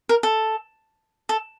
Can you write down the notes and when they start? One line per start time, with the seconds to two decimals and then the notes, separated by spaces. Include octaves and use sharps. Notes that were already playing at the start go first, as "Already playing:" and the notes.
0.09 A#4
0.23 A4
1.29 A4